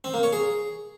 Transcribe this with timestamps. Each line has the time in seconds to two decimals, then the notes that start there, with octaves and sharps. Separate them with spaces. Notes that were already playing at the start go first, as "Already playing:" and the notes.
0.04 C4
0.14 A#3
0.23 C#5
0.33 G#4